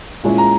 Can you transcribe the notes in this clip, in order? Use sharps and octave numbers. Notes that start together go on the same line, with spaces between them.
A#2 G#3 C#4 E4
A#5